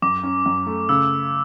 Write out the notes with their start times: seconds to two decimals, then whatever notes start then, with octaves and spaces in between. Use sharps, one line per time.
0.02 F#2 D6
0.23 C#4
0.46 F#2
0.67 A3
0.89 C#3 E6